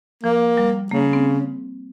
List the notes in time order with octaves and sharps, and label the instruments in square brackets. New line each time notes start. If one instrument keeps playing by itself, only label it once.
[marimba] F3 [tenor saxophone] A#3
[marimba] G3
[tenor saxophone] C#3 [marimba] A#3
[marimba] C4